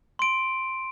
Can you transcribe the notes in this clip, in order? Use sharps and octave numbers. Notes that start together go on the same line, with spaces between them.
C6 D7